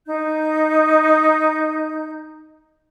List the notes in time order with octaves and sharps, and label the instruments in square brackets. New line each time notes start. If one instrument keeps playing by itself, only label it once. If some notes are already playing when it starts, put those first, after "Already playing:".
[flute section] D#4 G6